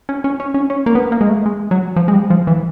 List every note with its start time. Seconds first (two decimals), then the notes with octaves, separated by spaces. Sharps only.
0.09 C#4
0.24 C#4
0.40 C#4
0.54 C#4
0.70 C#4
0.86 A#3
0.95 B3
1.12 A#3
1.21 G#3
1.29 A3
1.46 G#3
1.71 F#3
1.96 F3
2.08 G#3
2.13 G3
2.30 F3
2.47 E3